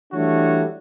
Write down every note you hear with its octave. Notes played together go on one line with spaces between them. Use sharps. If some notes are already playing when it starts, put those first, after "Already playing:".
E3 G3 A3 D4 F#4 C#5